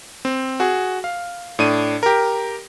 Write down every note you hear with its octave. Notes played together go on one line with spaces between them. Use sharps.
C4
F#4 G#4
F5
A2 D4 D#7
G4 A#4